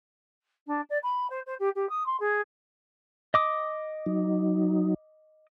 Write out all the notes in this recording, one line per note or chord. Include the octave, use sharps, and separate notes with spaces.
D4
D5
B5
C5
C5
G4
G4
D#6
C6
G#4
D#5 D6 D#6
F#3 D#4